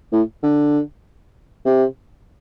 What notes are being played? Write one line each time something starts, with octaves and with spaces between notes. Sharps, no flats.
A2
D3
C3